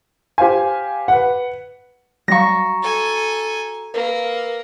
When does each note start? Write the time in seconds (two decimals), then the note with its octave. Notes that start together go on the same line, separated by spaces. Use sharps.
0.38 G4 C5 F5 G#5
1.08 B4 F#5
2.28 F#3 G3 F#4 F5 A#5 C#6 A#6
2.82 A4 G#5
3.94 A#3 A#4 B4